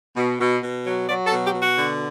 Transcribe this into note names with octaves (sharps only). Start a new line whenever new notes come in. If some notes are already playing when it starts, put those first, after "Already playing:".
B2
B2
B2
F#3
F#3 D5
A4
B2
G4
B2
F#4
D3